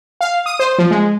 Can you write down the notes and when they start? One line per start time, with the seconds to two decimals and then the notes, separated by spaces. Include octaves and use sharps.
0.21 F5
0.46 D#6
0.59 C5
0.78 F3
0.91 G#3